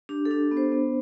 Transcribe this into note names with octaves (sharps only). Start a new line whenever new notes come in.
D4 G4
A4
D4
B3
C5
B3